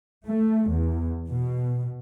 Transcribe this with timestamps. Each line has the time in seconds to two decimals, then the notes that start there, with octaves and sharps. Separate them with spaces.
0.25 A3
0.70 E2
1.30 B2